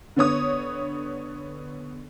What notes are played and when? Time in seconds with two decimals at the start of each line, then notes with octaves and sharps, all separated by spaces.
0.16 D3 B3 C#5 D#6